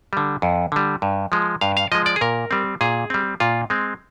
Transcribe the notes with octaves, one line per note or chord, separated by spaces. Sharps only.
D3 G3
F2
D3 G3
G2
F3 G#3
G2 F5
F5
F3 G#3 D#5
D5
G#4
A#2 A#4
G3 C4
A#2 G#4
G3 C4
A#2 F4
G#3 C4